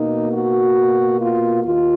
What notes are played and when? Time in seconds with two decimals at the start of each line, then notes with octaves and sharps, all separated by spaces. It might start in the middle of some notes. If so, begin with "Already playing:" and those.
Already playing: B2 A#3 D#4
0.32 F#4
1.21 F4
1.64 D#2 D#3 F4